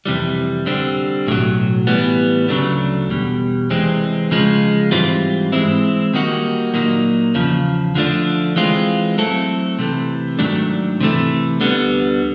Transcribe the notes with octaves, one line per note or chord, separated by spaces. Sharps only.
F2 C3 E3 G3
D3 G3 C4
B1 A2 F#3
A2 E3 G3 B3
D2 C#3 F#3 A3 D4
E2 B2 G3
E2 C3 E3 G#3 C4
C#3 F3 G#3
G#2 E3 G3 C4 F4
E3 G#3 C4 E4
D#3 G3 A#3 D#4 F#4
A#2 F#3 A#3 D#4
E2 C#3 F3
D3 F3 A3 D4
E3 G#3 C4 F4
F#3 A3 C4 E4 A4
C3 E3 A3
G#2 D#3 F#3 A3 D4
C3 E3 A3
D2 D3 G3 B3